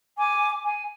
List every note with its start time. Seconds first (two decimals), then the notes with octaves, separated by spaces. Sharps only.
0.18 G#5 D6
0.62 G#5